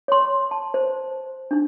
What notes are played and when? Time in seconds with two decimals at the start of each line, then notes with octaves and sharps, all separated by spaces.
0.08 C#5 C6
0.51 A5
0.74 C5
1.51 D4 D#4